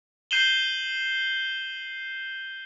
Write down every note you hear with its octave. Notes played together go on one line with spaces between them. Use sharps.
G6 C7 D#7 E7 F#7 G7